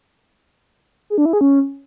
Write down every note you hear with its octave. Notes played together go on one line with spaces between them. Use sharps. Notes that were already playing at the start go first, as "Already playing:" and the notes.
G#4
D4
E4
G#4
C#4